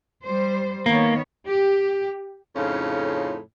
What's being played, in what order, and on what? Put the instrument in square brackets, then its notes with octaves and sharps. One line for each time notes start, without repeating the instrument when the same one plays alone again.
[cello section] G3 C5
[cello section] D#3 B3 C#5 [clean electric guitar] A#3
[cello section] G4
[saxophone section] F2 A2 C#3 C#4 D#4 F4